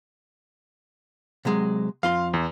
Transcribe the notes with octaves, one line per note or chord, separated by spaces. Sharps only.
C3 F#3 G#3
F2 F4 F5 C6
E2